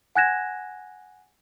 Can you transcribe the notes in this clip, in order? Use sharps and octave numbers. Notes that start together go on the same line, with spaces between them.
F#5 G#5 F#6 G#6 A#6 E7